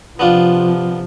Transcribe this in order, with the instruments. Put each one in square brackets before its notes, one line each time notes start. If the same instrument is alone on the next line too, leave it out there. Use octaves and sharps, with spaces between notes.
[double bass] C3 F3 [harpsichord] B3 D4 F4